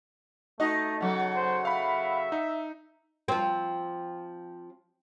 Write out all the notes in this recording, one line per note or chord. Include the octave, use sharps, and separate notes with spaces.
A3 D#4 F#4 D#5
C#3 F#3 A4 F#5
C5
E5 F5 B5
D#4
F3 C4